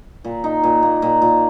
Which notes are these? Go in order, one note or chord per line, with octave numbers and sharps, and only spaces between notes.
A#2
D#4
A#2
A#3
A#2
A#2